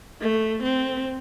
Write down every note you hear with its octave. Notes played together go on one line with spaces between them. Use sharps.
A3
C4